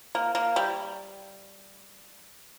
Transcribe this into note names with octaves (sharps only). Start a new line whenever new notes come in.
A#3
A#3
G3